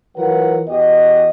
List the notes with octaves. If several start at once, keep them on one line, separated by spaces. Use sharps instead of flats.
E3 F#3 F4 A#4 B4 F#5
E2 F#4 G4 D#5